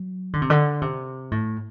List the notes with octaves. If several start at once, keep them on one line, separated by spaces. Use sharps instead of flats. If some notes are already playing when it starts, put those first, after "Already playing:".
Already playing: F#3
D3
C3
D3
C3
A2